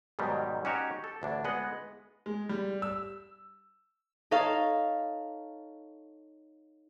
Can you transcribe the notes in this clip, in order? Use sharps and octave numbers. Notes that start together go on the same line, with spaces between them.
G#2 B2 D#3 F#3 G3
C#4 D#4 F#4 G4 C#5
A4
A1 D2 D4
G#3 B3 D#5 F#5
G#3
G3
E6
D#4 A4 C#5 F5